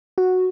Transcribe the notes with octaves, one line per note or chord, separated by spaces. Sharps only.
F#4